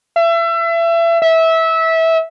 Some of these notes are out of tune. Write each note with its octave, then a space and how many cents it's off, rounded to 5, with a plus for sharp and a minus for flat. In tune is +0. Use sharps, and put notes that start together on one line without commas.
E5 +30
E5 -20